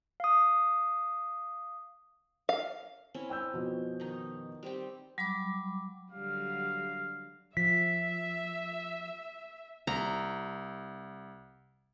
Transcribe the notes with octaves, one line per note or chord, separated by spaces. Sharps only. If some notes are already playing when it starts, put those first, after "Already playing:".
F5 D#6
F5
C4 C#4 E4
G5 E6 G6
F2 B2
D#3 D#4
G3 C4 G4
F#3 G3 B5 D6
D3 F#3 G3 F5
F3 E5 B6
C2 A#5